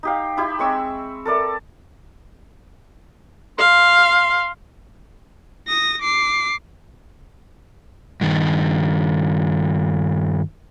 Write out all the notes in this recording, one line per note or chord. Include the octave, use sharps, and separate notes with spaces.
D#4 G4 F5
D#4 E4 G4
G#3 C4 C#6 E6
A4 A#4 D5 E5
F5 C6
D#6 A#6
D6 C7
G2 D#3